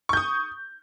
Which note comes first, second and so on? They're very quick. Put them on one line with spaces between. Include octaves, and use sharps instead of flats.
C#6 G6 D#6